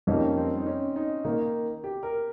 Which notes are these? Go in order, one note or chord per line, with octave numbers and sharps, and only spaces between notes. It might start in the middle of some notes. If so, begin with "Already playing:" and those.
F2 D#3 G3 A#3 C#4 D#4
C4
D#4
C#4
D#4
D#3 A#3 D#4
G4
A#4